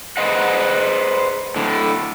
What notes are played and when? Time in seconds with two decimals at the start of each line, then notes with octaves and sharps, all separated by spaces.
0.17 G#4 B4 C5 D#5 F#5
1.56 A2 D3